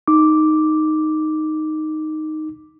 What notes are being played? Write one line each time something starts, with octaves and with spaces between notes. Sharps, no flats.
D#4 D6